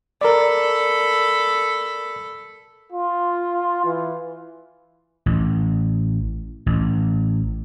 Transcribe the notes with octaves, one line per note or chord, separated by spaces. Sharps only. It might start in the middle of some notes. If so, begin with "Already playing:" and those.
A4 A#4 D5 B5
F4
E3
A1
A1